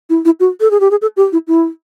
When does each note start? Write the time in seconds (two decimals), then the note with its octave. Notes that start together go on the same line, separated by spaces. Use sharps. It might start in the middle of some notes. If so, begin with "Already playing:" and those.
0.10 E4
0.25 E4
0.40 F#4
0.61 A4
0.71 G#4
0.80 G4
0.91 G#4
1.02 A4
1.17 G4
1.32 E4
1.48 E4